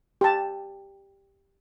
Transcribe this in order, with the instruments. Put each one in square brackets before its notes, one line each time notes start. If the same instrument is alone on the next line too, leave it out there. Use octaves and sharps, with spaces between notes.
[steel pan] G4 A5